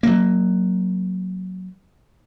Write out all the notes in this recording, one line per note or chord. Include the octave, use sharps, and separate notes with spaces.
F#3 A#3